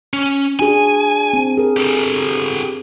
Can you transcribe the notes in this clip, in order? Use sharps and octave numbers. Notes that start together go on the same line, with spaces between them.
C#4
D4 F#4 G#4 G#5
C4
G#4 A#4
G4 A4